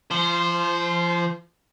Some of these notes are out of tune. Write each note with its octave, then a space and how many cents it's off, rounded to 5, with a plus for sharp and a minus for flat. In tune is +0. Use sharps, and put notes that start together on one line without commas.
F3 -30 C5 +0